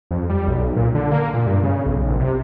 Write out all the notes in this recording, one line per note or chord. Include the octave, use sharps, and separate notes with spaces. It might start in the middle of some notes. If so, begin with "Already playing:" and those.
F2
G3
B1
A#2
D3
A#3
A#2
G2
C#3
B1
A#1
C3